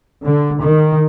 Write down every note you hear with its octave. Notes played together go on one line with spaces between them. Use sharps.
D3
D#3